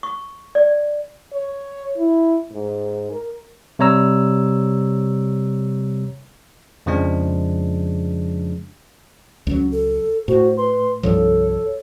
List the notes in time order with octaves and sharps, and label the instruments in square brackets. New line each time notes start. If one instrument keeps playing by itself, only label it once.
[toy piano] C#6
D5
[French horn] C#5
E4
G#2
A#4
[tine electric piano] C3 G3 C#5 A#5 E6
F2 C#3 F3 G#3 D4
[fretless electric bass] C#2 F#3 [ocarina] C#4
[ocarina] A4
[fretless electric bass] A2 [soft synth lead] F#4 [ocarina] C5
[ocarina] B4 [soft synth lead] C6
[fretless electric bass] C2 G2 F3 [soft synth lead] A4 [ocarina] C#5